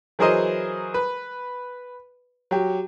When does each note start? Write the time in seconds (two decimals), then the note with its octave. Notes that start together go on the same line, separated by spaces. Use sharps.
0.19 E3 F#3 G#4 A#4 C5 D#5
0.94 B4
2.51 F#3 G4